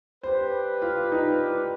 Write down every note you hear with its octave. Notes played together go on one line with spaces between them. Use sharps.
D4 G4 B4 C5
F4
D#4